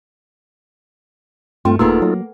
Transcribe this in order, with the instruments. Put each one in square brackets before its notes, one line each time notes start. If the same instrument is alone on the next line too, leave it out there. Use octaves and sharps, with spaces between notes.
[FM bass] G2 [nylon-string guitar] A3 [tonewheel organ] C4 F4
[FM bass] D#1 [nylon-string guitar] A#3 B3 G#4 [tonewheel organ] D#4 F4 A4
[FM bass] F#3 [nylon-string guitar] A#3